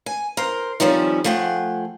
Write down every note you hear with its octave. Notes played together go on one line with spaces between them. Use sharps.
G#5
A#4 C5
D#3 F3 G3 C4 C#4
F3 A3 G#4 F#5 G5